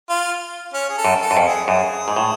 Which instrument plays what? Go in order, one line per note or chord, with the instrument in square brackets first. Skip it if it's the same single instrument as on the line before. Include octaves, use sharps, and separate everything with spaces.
[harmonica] F4
C#4
G#4
A4
[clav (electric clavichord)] F#2
[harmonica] A4
[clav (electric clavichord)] F#2
F2
[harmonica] G#4
[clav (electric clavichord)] F#2 [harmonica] G#4
[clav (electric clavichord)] G#2
A2